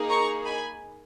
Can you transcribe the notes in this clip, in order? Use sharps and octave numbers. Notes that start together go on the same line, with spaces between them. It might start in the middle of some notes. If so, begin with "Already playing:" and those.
Already playing: A#3 D#4 G#4
A#5 C#6
G#5 B5